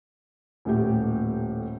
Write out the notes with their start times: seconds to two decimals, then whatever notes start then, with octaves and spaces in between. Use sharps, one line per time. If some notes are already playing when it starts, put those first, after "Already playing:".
0.65 D#1 A2 G4